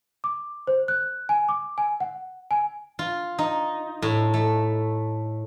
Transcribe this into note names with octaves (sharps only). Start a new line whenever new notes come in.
D6
C5
F#6
G#5
D6
G#5
F#5
G#5
F4
D#4
A2
A3